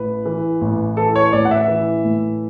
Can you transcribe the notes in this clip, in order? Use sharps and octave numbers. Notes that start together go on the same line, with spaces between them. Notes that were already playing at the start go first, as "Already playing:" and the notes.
Already playing: A1 B4
E3
A1
E3 A4
C#5
A1 D5
F#5
E5
E3
A2